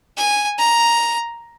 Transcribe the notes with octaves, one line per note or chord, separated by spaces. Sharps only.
G#5
A#5